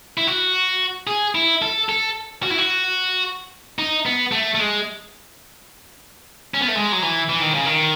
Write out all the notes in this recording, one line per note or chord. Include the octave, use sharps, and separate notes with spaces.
E4
F#4
G#4
E4
A4
A4
F#4
E4
F#4
D#4
B3
A3
A3
G#3
C#4
B3
A3
G#3
F#3
E3
E3
D#3
C#3
D#3